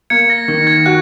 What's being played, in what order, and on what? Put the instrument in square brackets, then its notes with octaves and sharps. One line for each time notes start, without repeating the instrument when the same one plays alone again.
[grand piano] A#3 [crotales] G#6 C#7
[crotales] A#6
[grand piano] D#3 [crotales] A#6
[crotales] G#6
[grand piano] F#4 [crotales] F#6